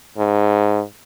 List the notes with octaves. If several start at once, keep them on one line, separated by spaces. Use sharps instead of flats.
G#2